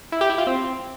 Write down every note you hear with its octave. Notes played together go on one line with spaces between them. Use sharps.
E4
G4
E4
F4
C4